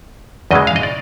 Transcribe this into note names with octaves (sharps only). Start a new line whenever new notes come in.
E2 C#3 E3 G#3 D#5
F5
D#5
D5